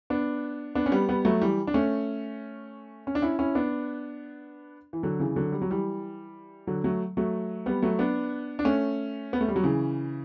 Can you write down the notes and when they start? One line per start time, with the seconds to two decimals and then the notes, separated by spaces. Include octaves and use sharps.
0.10 B3 D4
0.75 B3 D4
0.86 C#4
0.92 G3 B3
1.09 G3 B3
1.25 F#3 A3
1.41 E3 G3
1.67 D4
1.74 A3 C#4
3.07 C#4
3.15 D4
3.22 C#4 E4
3.39 C#4 E4
3.55 B3 D4
4.93 E3
5.03 D3 F#3
5.19 C#3 E3
5.36 D3 F#3
5.52 G3
5.62 F#3
5.70 E3 G3
6.67 D3 F#3
6.84 F#3 A3
7.17 F#3 A3
7.66 G3 B3
7.82 F#3 A3
7.99 B3 D4
8.59 D4
8.65 A3 C#4
9.33 B3
9.41 A3
9.48 G3
9.56 F#3
9.63 C#3 E3